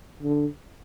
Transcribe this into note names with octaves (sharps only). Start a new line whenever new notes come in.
D3